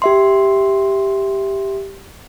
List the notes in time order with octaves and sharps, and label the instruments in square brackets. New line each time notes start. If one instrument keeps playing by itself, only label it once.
[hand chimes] G4 E5 C6